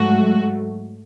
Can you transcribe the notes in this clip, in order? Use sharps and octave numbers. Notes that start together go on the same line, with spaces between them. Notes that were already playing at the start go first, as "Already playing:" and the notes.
Already playing: G#2 F#3 A3 F#4